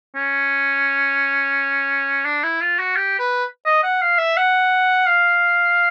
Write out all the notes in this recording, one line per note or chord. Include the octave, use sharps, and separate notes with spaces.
C#4
D4
E4
F4
F#4
G4
B4
D#5
F#5
F5
E5
F#5
F5